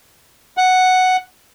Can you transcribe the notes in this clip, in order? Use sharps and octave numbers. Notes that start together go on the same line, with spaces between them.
F#5